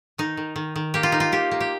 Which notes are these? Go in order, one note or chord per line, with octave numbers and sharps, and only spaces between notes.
D#3 D#4
D#3
D#3
D#3
A#3 G4
F4
A#3 D#4
F4
A#3 G4
A#3
G4